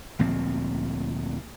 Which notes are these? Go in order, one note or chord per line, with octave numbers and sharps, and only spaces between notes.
D2 A#2 F3 C4